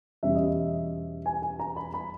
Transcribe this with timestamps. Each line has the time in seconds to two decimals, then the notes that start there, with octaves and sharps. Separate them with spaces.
0.23 E2 B2 G3 C#4 E5
0.35 D#5
0.47 E5
1.26 G#5
1.42 G#5
1.59 A#5
1.76 B5
1.94 B5